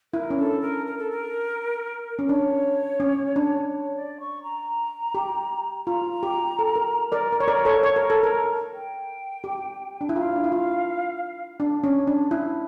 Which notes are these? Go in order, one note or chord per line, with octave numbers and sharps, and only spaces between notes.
E4 A#4
C#4
D4 A4
A#4
A#4
A4
A#4
C#4
D4 C#5
C#4
D4
C#5
D5
C#6
A#5
G4
F4 A#5
G4
A4
A#4
A#4 D5
A#4
C#5
A#4 D5
A4 C#5
C#5
A#4
A4
A#4
G5
G4
D4
E4
F4 F5
D4
E4
F4
D4
C#4
D4
E4